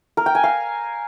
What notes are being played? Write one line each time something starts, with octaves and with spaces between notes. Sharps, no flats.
A#4
G5
G#5
F5